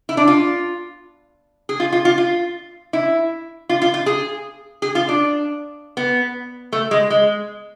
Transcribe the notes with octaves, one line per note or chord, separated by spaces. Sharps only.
E4
D4
F4
G#4
F4
F4
F4
F4
E4
F4
F4
F4
G#4
G#4
F4
D4
B3
A3
G#3
G#3